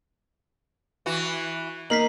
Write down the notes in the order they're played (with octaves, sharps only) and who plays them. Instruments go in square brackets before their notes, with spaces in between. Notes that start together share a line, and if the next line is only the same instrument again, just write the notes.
[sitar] E3 F#4
[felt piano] A#3 [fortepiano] D#4 A#4 [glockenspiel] B6 C7 F#7